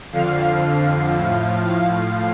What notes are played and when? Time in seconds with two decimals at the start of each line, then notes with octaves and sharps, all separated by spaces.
0.13 F2 D3 F3 F5
1.17 A2 F3
1.69 F5